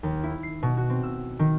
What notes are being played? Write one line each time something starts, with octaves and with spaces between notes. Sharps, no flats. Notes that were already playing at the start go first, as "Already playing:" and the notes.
D#2
E4
C7
B2
F#4
C4
E6
D#3